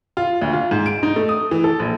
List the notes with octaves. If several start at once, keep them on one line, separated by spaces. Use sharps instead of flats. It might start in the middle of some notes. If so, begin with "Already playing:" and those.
F4
D2
F4
G#2
D7
D#4
A3
D#6
E3
A4
A#1